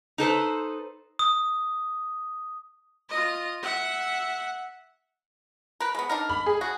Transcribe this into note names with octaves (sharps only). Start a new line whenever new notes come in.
D#4 A4 B4 C5
D#6
F4 D#5
E5 F#5
A#4 B4
G#3 B3
D4 D#4 A#4
B5
G#4
F#4